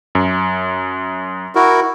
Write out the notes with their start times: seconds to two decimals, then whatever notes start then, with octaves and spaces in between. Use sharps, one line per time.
0.15 F#2
1.55 E4 F#4 A#4